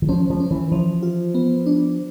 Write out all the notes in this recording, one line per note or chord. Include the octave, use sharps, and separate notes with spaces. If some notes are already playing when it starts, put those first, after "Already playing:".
E3
F3 C#4
F3
C#4
E3
E3 F3
F4
B3
D4